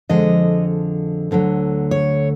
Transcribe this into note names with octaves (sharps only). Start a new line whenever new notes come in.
F2 D3 F3 G#3 D#5
D2 D3 F#3
C#5